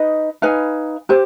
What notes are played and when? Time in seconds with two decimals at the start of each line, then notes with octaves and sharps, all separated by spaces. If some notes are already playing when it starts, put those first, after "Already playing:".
Already playing: D#4 B4 D#5
0.42 D#4 B4 F5 G#5
1.09 G4 C5